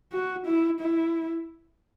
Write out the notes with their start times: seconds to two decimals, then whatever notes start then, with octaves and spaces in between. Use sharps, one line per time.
0.12 F#4
0.46 E4
0.80 E4